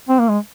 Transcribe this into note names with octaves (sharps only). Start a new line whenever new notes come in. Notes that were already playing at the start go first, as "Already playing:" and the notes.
C4
A#3
G#3